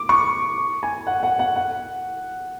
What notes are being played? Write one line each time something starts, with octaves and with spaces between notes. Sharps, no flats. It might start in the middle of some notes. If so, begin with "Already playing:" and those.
Already playing: D6
C#6
G#5
F#5
F#5
F#5
F#5